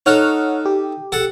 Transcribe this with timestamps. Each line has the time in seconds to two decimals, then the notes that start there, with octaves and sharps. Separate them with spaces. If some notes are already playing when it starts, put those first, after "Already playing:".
0.06 D#4 A4 C#5 F#5 F6
0.65 G4
1.12 A4 F#5